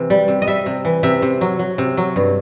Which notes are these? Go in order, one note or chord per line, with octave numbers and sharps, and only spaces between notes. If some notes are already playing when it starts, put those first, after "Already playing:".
Already playing: C3 E3
G3
C3
D#5
G3 E5
C3
E3
C3 E5
C3
F#3
F#3
C3
F#3
G2